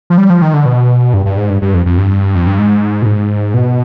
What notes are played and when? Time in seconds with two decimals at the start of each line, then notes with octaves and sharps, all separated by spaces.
0.10 F3
0.18 G3
0.30 F3
0.42 D#3
0.54 D3
0.66 B2
1.14 G2
1.26 G2
1.37 G#2
1.50 G2
1.62 G2
1.74 F2
1.86 F2
1.98 G2
2.35 F2
2.47 G2
2.58 G#2
3.02 B2
3.06 G#2
3.54 B2